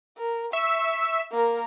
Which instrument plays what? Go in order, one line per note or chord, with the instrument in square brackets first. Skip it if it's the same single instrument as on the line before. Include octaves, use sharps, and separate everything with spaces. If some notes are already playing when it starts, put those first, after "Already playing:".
[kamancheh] A#4
[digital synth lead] E5 [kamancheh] C#6
[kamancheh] A#3 A#4